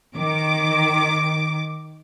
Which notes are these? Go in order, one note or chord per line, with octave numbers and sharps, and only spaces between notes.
D#3 D6